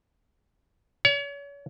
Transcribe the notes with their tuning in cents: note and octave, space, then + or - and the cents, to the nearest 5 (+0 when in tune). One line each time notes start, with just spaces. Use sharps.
C#5 +35